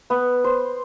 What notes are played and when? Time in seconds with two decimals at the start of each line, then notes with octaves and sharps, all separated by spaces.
0.10 B3
0.44 C5